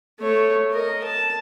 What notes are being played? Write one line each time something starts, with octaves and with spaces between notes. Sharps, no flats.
A3 C#5
A#4 D#5
A5